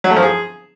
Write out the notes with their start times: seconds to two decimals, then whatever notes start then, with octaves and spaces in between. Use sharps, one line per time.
0.04 F#3
0.10 A3
0.16 F3
0.22 G#4